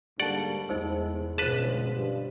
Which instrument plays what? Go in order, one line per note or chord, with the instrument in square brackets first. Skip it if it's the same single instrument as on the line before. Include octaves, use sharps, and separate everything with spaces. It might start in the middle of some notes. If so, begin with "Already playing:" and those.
[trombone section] G#2 D3 A#3 [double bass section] G3 [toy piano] G4 A5 [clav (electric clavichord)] D5 F#5
[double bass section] E2 [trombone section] G#3 [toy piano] D#4 C5 E6
[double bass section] G1 B2 F3 [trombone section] C#2 [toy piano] G#4 C5 [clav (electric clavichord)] B4 A5
[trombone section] G2